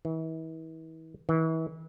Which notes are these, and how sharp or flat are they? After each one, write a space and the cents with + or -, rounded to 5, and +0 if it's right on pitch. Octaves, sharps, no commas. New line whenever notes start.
E3 -40
E3 -35